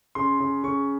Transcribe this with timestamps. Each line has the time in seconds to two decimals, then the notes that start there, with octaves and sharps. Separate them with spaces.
0.15 C#3 C6
0.40 C#3
0.64 C#3 C#6